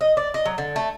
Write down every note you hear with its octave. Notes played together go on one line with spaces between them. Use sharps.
D#5
D5
D#5
F#3
D3
A3